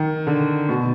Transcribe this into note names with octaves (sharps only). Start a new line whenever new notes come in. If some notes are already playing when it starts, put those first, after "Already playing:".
Already playing: D#3
D3
B2